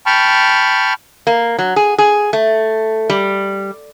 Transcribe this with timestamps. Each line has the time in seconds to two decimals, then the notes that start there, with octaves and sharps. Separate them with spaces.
0.06 G5 A5 B5 C#6 F6
1.27 A#3
1.59 F#3
1.76 G#4
1.98 G#4
2.33 A3
3.10 G3